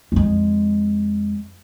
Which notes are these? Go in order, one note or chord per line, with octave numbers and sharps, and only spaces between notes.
F2 G#3